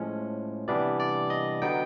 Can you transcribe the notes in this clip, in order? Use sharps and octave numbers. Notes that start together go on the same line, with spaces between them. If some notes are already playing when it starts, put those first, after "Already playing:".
Already playing: A2 F3 G#3 C#4
C3 E3 G3 B3 D4 D5
D5
D#5
D3 F#3 B3 D#4 G5